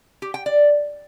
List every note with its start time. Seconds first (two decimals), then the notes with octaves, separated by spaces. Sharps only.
0.22 G4
0.34 G5
0.46 D5